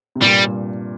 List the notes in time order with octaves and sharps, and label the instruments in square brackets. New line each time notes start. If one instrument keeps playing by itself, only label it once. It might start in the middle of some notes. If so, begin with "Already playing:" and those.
[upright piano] C3
[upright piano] G2 A#2 [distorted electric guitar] G3
[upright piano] G2